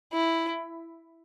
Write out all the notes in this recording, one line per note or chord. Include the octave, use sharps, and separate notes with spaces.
E4